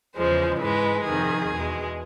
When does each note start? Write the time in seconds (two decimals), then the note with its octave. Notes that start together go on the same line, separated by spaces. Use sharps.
0.15 E2 C#3 F3 G#3 C5
0.60 G#2 E3 G#3 B4
1.05 F2 C3 D#3 G#4
1.51 E2 B2 G#3